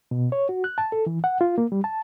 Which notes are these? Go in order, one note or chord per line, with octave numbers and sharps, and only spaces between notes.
B2
C#5
F#4
F#6
A5
A4
E3
F#5
F4
A#3
G3
A5